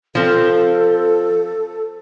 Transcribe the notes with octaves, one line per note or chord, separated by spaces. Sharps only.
F3 C4 A4